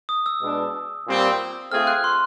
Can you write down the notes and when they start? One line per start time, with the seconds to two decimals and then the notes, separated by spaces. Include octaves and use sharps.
0.09 D#6
0.26 E6
0.42 B2 G#3 B3 D4
1.07 A#2 G3 C4
1.71 A3 C4 F4 G#4 F6
1.87 F#6
2.04 C6